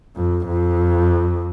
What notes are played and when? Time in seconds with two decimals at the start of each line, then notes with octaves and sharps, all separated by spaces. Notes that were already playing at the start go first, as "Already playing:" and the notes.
0.17 F2
0.47 F2